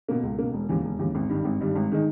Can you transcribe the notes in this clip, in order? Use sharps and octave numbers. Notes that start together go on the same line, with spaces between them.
B2 A#3
C#2
B2 A#3
E1
D#2 C#3 E3
E1
D#2 C#3 E3
G#1
G2 D#3 G3
G#1
G2 D#3 G3
G#1
D#3 G#3 D#4